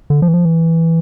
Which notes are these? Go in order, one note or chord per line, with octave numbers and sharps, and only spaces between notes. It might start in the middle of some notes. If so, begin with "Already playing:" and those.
D3
F3
E3
F3
E3